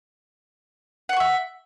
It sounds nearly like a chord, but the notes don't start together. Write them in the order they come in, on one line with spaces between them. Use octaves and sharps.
F#5 C6 C#6 E5